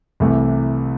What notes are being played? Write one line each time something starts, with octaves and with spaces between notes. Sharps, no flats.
C2 C3 E3 A3